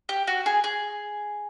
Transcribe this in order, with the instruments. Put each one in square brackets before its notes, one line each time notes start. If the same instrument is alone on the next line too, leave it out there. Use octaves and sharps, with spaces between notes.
[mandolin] G4
F#4
G#4
G#4